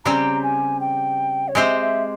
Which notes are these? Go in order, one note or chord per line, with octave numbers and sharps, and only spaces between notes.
C#3 G3 C4 G4 A#5
G#5
G5
C#5
G#3 C4 G4 C5 E5
E5